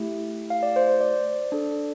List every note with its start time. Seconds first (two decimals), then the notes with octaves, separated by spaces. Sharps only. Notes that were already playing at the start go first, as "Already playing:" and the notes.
Already playing: A3 E4 G4
0.50 F5
0.63 D5
0.76 C5
0.88 C5
1.01 D5
1.52 D4 A4